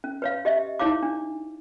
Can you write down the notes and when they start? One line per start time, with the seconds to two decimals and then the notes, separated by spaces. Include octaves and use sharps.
0.04 C#4
0.22 B4 C#5 F5
0.45 G4 D#5 E5
0.79 D#4 E4 C#5 F5 D6
1.03 D4